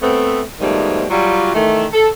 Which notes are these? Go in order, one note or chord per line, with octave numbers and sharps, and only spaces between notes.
A3 B3 C4
G#2 B2 D#3 F3 G3 A3
F#3 G3 F4
D#3 E3 A3
A4